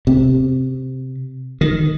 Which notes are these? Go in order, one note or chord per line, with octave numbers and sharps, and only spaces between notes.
C3
D#3